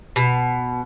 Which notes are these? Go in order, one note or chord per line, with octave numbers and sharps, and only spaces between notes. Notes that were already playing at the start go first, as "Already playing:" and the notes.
B2